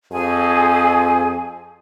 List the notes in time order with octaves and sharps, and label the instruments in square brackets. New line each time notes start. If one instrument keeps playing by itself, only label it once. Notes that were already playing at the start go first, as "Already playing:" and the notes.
[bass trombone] F2 [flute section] G#4 G#5